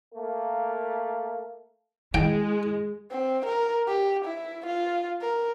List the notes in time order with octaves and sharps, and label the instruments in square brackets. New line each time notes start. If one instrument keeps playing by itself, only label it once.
[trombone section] A3 A#3
[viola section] G#3 [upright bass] E4 [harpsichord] G5
[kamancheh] C4
A#4
G4
E4
F4
A#4